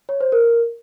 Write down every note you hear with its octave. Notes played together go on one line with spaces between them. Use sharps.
C#5
C5
A#4